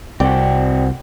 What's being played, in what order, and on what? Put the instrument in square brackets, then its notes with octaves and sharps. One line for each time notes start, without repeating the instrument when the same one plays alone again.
[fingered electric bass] C2 [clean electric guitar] C4 F#4 [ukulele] D5 G5